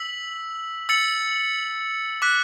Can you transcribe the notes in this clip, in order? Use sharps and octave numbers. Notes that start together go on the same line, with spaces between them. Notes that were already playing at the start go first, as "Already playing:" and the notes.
Already playing: E6 B6 F#7
E6 A6 C#7 F#7
D6 F#6 B6